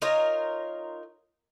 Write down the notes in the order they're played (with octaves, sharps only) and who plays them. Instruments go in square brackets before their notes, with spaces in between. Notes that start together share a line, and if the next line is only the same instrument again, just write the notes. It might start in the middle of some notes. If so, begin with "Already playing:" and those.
[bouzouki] D#4 F4 A#4 C#5